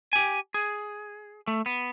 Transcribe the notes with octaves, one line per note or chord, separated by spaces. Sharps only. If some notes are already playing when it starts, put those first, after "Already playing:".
G4 G#5
G#4
A3
B3